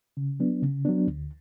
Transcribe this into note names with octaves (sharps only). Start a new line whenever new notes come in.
C#3
F#3 B3 D4
C#3
F#3 B3 D4
D2